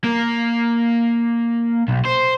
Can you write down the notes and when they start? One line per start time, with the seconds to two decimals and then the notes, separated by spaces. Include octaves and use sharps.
0.04 A#3
1.88 B1
2.05 C5